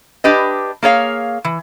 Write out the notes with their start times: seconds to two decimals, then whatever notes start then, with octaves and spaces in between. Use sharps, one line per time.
0.24 D4 G4 B4 D#5
0.83 A#3 G#4 C#5 F5
1.45 E3